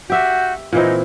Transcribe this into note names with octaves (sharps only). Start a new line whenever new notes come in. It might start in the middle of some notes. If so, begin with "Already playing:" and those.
F#4 G4 E5 G6
A#2 E3 C4 D#4